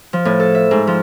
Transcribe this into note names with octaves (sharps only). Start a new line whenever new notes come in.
F3
A2
A4
E5
G#2
F3